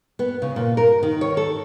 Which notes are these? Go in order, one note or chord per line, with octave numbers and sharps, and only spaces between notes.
B3
C#3
A#2
A#4
D#3
C#5
A4